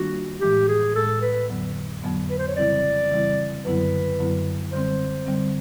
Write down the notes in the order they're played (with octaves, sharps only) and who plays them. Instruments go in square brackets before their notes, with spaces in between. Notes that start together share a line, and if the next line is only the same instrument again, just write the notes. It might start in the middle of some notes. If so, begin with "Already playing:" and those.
Already playing: [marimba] D#3 G3 A#3 D4 F4 [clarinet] F#4
[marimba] A2 E3 G#3 [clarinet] G4
[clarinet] G#4
[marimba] A2 E3 G#3 [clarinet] A4
[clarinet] B4
[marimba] F2 D3 F#3 B3
F2 D3 F#3 B3
[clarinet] B4
C5
C#5
[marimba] C#3 E3 G3 C4 E4 [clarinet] D5
[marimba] C#3 E3 G3 C4 E4
[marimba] F#2 D3 F#3 B3 E4 [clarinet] B4
[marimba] F#2 D3 F#3 B3 E4
[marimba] D3 G3 C4 [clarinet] C5
[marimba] D3 G3 C4